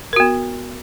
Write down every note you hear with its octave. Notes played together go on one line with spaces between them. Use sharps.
B3 F#4 A#4